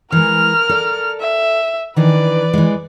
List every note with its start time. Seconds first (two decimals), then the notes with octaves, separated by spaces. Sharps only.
0.12 E3 G#3 A#4 F6
0.69 A4 D5
1.20 E5
1.96 D#3 E3 D4 B4 D5
2.53 E3 G#3